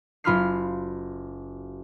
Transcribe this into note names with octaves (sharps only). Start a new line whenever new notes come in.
F#1 F4 B5 C6 F6 C7